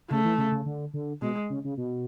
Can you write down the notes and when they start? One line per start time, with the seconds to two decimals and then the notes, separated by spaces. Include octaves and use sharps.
0.11 C#3 A3
0.25 E3
0.38 C#3
0.52 C#3
0.66 D3
0.94 D3
1.22 B2 G#3
1.50 C#3
1.64 C#3
1.77 B2